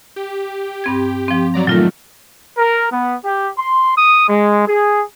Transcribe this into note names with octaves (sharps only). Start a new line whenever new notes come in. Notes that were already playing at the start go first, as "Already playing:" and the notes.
G4
G2 C4 G#6
F3 C4
F#3 D5 A#5
A#2 D#3 F#3 A3 F4 A#6
A#4
B3
G4
C6
D#6
G#3
G#4